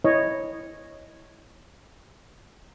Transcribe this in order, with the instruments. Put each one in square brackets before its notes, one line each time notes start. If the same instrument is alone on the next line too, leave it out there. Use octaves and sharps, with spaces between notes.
[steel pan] E4 C#5 D#5